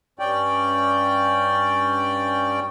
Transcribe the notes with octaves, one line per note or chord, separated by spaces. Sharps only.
G2 C#4 D5 G5